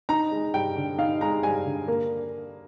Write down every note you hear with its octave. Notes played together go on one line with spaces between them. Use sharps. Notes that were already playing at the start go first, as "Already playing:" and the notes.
D#4 A#5
G#3
G2 G5
D3
D#4 F5
G#3 A#5
G2 G#5
D3
A#3